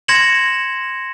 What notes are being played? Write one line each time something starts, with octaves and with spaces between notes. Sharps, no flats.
C6 G#6 A#6 C#7 E7 F#7